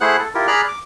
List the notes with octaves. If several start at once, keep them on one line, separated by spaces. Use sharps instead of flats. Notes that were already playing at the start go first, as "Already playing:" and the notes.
A3 E4 G#4 C5 F#5 F#6
A4
E4 F4 G4 A#4
G#4 D5 A#5 B5 F6 F#6
D6